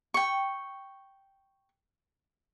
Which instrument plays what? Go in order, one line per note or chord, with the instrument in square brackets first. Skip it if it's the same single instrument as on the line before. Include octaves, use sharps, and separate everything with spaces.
[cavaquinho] G5 C#6